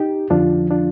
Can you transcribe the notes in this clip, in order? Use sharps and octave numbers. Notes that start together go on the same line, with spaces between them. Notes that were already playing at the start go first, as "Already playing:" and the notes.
Already playing: D#4 G4
F2 D3 F3 D4 F4
D4 F4